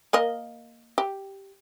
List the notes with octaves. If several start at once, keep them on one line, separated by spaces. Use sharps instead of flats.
A#3 A#4 D#5
G4